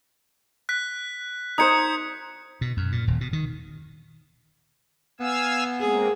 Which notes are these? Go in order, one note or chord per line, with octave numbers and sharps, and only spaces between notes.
F#6 B6
D#4 C5 D#6 G#6 C#7
B2
F#2
A#2
D#1
B2
D#3
B3 F5 G#5 E6
G#3 A#3 C4 G#4